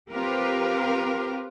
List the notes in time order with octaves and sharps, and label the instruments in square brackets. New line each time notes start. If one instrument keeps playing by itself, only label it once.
[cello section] C4 F4 G4 A#4 B4